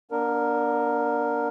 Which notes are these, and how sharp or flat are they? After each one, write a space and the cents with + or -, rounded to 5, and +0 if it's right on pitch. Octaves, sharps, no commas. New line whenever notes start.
B3 -45 D4 +0 A#4 +0